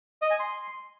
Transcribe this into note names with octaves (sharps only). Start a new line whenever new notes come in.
D#5
G#5
C6